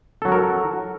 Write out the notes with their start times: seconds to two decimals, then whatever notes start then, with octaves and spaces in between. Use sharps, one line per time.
0.22 A4
0.25 F#3
0.28 F#4
0.32 A#4